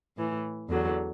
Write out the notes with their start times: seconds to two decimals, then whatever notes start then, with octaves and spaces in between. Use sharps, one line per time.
0.17 A2 E3
0.69 E2 D3 F#3